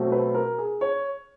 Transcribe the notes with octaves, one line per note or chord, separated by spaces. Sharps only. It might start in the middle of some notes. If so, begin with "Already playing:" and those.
Already playing: B2 F#3 A3 C4
B4
A#4
G#4
C#5